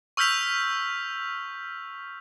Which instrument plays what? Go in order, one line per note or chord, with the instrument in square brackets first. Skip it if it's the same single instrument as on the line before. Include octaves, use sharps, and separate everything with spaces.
[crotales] C#6 E6 F6 G6 B6 F7